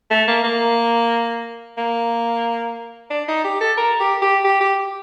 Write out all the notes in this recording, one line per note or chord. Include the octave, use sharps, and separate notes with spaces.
A3
A#3
A#3
A#3
D4
D#4
G4
A4
A#4
G4
G4
G4
G4